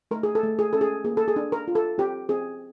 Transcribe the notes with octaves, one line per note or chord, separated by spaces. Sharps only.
A3 A#4
G#4
A4
A3
G#4
C#4 A4
G#4
A#3 G#4
A4
G#4
D4
A#4
F4
A4
C4 G4
C4 G#4